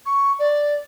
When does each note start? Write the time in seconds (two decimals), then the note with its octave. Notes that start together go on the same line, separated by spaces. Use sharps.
0.05 C#6
0.39 D5